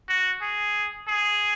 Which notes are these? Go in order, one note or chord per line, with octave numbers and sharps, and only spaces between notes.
F#4
G#4
G#4